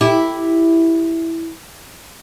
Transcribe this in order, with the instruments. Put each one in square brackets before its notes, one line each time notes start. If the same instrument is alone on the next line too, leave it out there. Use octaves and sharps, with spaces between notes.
[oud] E4 G4